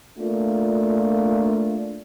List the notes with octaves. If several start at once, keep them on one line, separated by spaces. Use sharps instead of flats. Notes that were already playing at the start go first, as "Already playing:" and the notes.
A3 A#3 D4 F4